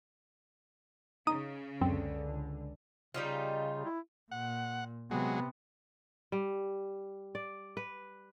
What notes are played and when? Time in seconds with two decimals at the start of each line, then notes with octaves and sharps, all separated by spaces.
1.27 C#3 D#4 D#6
1.81 C#2 F#2 D3 C4
3.14 C#3 G3 D#4 F4
3.85 E4
4.31 A#2 F#5
5.11 C3 F#3 G#3 B3
6.32 G3
7.35 D5
7.77 B4